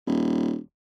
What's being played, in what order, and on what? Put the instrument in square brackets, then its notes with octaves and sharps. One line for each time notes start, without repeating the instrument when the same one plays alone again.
[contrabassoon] D#1